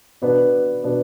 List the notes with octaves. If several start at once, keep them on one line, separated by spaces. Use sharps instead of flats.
B2 B3 D4
B2 B3 D4